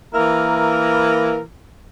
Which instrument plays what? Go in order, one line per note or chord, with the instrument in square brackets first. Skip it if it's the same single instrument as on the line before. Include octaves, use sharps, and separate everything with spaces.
[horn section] E3 A#3 E4 A#4